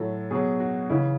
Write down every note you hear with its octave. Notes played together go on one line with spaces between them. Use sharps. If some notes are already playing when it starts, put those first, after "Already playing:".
Already playing: A2 F#3 A4
B2 F#3 G#4
F#4
C#3 E3 E4